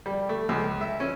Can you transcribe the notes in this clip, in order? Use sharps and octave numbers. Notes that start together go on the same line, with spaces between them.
G3
A3
C#2
E5
C#4